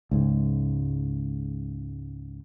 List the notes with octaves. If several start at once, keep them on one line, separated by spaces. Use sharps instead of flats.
C#2 G#2